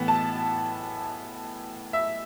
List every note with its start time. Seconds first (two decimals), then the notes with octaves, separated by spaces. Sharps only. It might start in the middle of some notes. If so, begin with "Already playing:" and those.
Already playing: A2 E3 B3
0.08 A5
1.93 E5